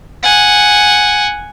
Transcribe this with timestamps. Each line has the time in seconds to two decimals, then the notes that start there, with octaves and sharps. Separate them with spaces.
0.23 F#5 G#5